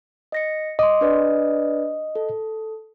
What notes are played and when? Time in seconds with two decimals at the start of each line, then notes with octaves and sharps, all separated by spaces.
0.32 D#5 A#6 C#7
0.79 D#5 C6 D6
1.01 D4 B4 D5
2.15 A4